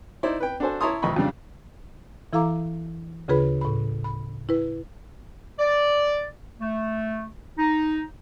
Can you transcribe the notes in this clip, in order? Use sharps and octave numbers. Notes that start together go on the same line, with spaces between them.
D#4 E4 C5 D5
B4 G5
D4 F#4 A4 C5 G#5
E4 C#5 A5 A#5 C6 D#6
G#1 F2 C3 D#5 B5 C#6
F2 C#3 G3 D4
E3 E4 A4 F5 A#5 D6
D2 C#3 F4 G#4 B4 B5
A2 B5
B5
E4 B4
D5
A3
D#4